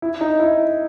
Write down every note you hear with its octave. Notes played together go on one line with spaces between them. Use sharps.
E4
D#4
E4